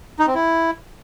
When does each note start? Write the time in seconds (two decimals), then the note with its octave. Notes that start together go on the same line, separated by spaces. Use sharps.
0.19 D#4
0.27 C4
0.35 E4